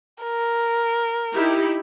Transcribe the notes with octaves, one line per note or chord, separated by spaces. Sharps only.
A#4
D#4 E4 G4